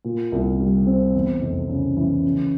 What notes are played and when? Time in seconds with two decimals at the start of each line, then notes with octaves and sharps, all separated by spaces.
0.05 A#2
0.32 C2
0.60 G3
0.87 C4
1.15 E2
1.42 F1
1.70 C#3
1.97 E3
2.24 C#3